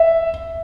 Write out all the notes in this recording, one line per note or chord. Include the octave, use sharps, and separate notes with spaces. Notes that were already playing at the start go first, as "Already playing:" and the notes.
Already playing: E5